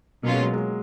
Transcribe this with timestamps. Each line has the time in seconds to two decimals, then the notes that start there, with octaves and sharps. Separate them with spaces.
0.23 B2 F#3 A#3 C#4 F4
0.34 G#3
0.43 F#3
0.53 G#3